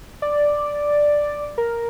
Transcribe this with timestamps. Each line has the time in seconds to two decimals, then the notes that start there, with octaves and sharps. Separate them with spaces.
0.22 D5
1.58 A#4